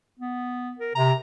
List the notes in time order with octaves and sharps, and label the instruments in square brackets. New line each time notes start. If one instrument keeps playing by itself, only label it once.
[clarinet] B3
A#4
[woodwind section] C3 [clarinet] A#5